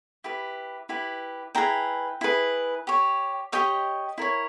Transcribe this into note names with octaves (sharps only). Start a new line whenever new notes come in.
E4 G4 B4
E4 G4 B4
E4 G#4 B4 G5 A#5
E4 G#4 B4
G4 C#5
G4 C#5 D#5 G5
E4 A#4 C#5